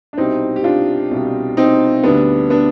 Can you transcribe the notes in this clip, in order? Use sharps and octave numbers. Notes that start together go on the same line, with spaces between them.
D4
C2 B2 G3 C4 D#4
G4
D4 F4
C2 B2 G3
C4 D#4
D2 D3 G3 B3 D4
B3 D4